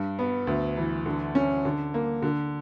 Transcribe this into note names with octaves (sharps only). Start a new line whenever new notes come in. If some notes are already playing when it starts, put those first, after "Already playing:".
Already playing: G2
B3
D2
E3
D3
C#4
D3
A#3
D3